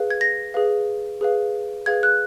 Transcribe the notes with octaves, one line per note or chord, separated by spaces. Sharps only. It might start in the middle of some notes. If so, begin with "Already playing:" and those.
Already playing: G#4 B4 F5
G#6
A#6
G#4 B4 F5
G#4 B4 F5
G#4 B4 F5 G#6
F#6